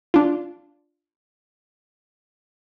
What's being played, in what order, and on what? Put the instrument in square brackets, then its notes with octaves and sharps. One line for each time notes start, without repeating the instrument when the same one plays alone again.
[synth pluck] D4 F4